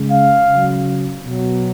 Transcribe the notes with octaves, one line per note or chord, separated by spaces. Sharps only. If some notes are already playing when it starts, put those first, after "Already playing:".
Already playing: C#3 G#3
F5
C#3 F#3
B2 F#3